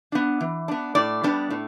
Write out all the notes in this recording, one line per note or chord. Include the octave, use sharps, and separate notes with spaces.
B3 D4
E3
B3 D4
A2 D5
G3 B3 D4
A2